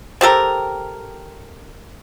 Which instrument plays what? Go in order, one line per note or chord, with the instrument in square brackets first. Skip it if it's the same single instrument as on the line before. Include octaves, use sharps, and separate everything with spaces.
[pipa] C4 G4 A4 A#4